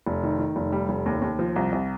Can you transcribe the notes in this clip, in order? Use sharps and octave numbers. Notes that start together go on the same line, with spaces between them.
F1
D#3
D#3
F1
G3
F1
D#2
D#2
F3
C2
C2